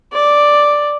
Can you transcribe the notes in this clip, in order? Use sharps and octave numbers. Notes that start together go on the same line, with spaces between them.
D5